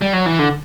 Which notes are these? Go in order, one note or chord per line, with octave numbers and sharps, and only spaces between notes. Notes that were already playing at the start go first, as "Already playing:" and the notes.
G3
F#3
E3
D3